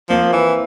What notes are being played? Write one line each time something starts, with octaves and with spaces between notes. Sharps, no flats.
F3 A#3 C4
E3